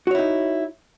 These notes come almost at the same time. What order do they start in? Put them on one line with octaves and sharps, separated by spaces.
F#4 C#5 E4 D#4